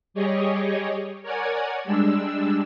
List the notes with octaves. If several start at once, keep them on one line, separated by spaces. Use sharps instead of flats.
G3 G4 G#4 C#5 D#5
A#4 C#5 D5 F#5 G#5 G#6
G3 G#3 D4 E6